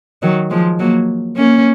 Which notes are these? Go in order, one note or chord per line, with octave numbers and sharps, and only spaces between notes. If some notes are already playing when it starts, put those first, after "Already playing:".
D#3 F#3
F3 G#3
F#3 A#3
A#3 C#4